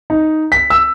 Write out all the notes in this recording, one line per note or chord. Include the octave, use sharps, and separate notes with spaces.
D#4
B6
E6